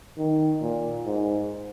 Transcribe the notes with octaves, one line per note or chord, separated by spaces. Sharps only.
D#3
A#2
G#2